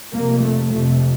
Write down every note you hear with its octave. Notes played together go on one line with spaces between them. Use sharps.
F2 C3 A#3
A3
F2 C3 A3